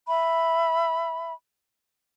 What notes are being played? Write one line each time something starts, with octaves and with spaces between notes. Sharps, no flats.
E5 B5